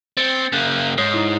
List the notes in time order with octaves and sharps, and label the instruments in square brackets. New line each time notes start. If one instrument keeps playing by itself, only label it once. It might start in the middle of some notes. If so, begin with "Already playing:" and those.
[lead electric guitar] C4 [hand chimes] A6 C#7
[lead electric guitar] C#3 A#3 [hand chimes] F#6 G6
[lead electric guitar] G#2 [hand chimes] C#5 D#6 C7
[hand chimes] D#4 E4